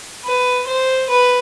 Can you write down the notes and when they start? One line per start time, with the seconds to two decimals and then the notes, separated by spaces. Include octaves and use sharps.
0.25 B4
0.68 C5
1.10 B4